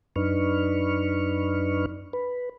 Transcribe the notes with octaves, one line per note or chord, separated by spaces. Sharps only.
F#2 D4 D#4 B4 C#6 F6
B4